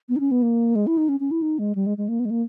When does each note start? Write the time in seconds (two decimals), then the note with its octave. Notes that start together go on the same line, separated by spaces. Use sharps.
0.09 B3
0.16 D#4
0.20 C#4
0.31 B3
0.42 A#3
0.75 G#3
0.87 E4
0.97 D#4
1.09 C#4
1.20 C#4
1.31 E4
1.42 D#4
1.59 G#3
1.75 G3
1.86 G#3
1.98 G#3
2.08 A#3
2.20 B3
2.25 G#3
2.30 A#3